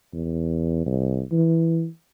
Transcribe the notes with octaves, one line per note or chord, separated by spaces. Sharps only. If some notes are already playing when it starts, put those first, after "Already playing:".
E2
C2
E3